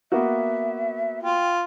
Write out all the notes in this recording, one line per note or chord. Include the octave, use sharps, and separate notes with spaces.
A#3 B3 F#4 E5
F4 G5